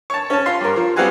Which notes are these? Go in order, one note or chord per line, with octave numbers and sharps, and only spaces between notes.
C#5 A5
C#4 A5
F4 C6
G2 A#4
F3
G3 B3 C4 F4 F#4 G#4